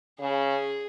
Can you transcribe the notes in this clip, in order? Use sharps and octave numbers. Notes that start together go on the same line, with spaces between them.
C#3 G#4